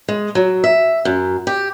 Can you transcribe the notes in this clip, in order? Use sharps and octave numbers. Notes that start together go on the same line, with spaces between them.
G#3
F#3
E5
F#2
G4